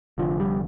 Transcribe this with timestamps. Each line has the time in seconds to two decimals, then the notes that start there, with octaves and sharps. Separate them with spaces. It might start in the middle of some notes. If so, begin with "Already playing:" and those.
0.18 F1 F2 D3 F3
0.40 G3